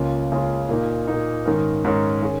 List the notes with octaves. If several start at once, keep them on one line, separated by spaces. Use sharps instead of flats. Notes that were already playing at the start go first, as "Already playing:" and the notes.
Already playing: C#2 C#3 A#3 C#4 F4
C#2 C#3 A#3 C#4 F4
A#2 A#3 D#4
A#2 A#3 D#4
G#2 D#3 C#4 A#4
G#2 D#3 C#4 A#4
D#3 C#4 G#4